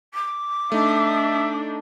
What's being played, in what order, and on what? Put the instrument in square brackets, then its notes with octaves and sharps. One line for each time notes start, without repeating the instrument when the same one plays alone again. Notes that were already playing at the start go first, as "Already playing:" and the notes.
[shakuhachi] D6
[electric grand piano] A3 D#4 [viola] D4 [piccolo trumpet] E5